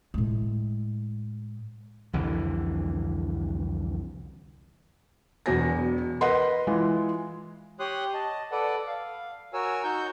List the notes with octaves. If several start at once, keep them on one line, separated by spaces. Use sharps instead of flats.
A2 G#3
C2 F2 D3 E3
E1 E2 F#3 G#5 A#6
A#4 B4 D#5 F#5 B5 C6
E3 G#3 F4
G4 C#5 C6 D#6 F#6
D#5 A5
A4 B4 D5 F#5
F5
F#4 A#4 C#5 G#5 E6
D#4 F#4 C#6 G6